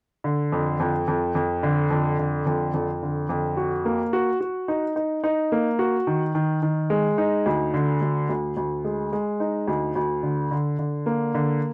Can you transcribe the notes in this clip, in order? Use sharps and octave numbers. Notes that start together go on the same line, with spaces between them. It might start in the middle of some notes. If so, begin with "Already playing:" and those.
D3
F2
F2
F2
F2
D3
F2
D3
F2
F2
D3
F2
F#4
A#3
F#4
F#4
D#4
D#4
D#4
A#3
F#4
D#3
D#3
D#3
G#3
D#4
D2
D3
D2
D2
D2
G#3
G#3
D#4
D2
D2
D3
D3
D3
A#3
D3